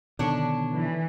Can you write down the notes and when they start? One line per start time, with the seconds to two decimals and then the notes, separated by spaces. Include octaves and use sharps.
0.19 B2 D3 D#3 D4 C#5
0.73 E3